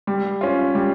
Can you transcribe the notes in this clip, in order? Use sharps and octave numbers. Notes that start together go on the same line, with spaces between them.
G3
C#4 F4
G3